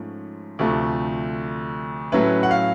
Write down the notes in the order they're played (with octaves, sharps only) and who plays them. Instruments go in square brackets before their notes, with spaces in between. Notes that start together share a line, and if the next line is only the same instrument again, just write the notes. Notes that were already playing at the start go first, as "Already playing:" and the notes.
Already playing: [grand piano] G#2 F3 A3 C#4
D2 C3 F3 A3
A2 F#3 A3 C#4 E4 B4
F#5
F5